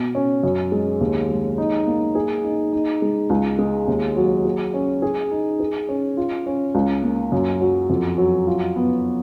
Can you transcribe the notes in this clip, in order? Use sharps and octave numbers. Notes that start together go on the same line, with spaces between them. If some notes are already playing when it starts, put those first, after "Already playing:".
Already playing: B2
C#4
F#2
G#3
D#2
G#3
D#4
A#3
G#4
D#4
D#4
G#3
C#2
G#3
D#2
F#3
G#4
C#4
G#4
D#4
G#4
C#4
F4
C#4
C#2
A#3
F#2
F#3
F2
F#3
F4
B3